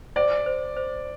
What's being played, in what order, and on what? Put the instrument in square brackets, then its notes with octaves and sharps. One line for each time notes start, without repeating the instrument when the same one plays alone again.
[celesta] C5 [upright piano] D5
[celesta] C5
C5